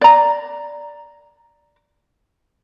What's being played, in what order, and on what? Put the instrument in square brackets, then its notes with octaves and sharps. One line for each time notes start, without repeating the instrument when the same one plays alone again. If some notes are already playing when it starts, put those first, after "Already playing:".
[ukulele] D5 A#5